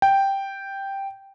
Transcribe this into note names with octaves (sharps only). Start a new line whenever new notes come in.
G5